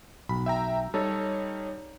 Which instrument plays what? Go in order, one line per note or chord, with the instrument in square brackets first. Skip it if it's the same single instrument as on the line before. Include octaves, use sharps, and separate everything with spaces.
[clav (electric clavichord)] B1 [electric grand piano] B5
[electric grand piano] E5 G5 A#5
[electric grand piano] G3 D#4 C#5 [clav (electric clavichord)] A4